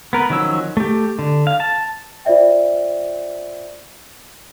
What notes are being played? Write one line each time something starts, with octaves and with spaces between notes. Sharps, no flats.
B3 A#4 B4
D#3 F3 F#3 C#4 E6
A3 G4
D3
F5
A5
F4 C5 D5 E5 G5